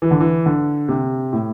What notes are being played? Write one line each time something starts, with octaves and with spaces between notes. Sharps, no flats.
E3
D3
E3
D3
C3
A2